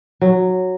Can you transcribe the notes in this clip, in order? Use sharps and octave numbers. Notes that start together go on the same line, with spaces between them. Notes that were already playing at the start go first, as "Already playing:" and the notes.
F#3